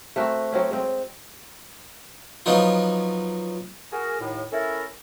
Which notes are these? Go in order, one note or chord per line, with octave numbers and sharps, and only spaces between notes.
A3 C4 F#4 A#4
F#3 C4 C#4
G#3 C4
F3 F#3 B3 D#4 F4
F#4 G#4 A#4
D#2 A2
C#4 E4 A4 A#4